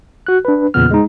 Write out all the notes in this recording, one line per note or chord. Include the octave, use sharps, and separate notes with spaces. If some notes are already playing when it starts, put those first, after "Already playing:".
F#4 F#6
D4 B4
E2 A#2 C#3 B3 F6
G#3 D#4